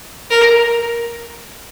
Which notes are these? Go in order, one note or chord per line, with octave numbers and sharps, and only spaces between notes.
A#4